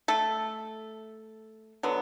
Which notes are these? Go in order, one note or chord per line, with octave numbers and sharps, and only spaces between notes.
A3 A4
D3 F#3 B3